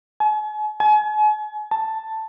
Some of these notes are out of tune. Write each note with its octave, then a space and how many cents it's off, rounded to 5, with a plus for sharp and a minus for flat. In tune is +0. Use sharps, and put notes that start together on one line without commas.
G#5 +45
G#5 +40
A5 +5